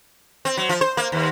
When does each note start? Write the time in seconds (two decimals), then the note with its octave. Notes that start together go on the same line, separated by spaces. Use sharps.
0.45 C4
0.57 F#3
0.69 F3
0.81 C5
0.97 A#3
1.12 D#2